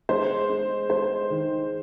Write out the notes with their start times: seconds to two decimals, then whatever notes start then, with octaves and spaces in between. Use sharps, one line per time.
0.09 G#3 C5
0.50 G#3
0.89 G#3 C5
1.30 D#3